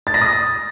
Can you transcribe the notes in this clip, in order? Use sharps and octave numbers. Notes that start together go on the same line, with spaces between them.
A6
A#6
D#6